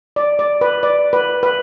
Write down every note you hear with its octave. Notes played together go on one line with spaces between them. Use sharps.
D5
D5
B4
D5
B4
B4